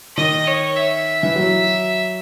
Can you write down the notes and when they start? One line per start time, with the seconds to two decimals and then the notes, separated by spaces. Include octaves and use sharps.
0.17 D#3 D#5
0.47 C#5
0.76 E5
1.23 E3
1.36 F#3